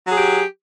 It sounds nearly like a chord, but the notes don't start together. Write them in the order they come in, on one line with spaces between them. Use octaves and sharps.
F#3 G#4 G4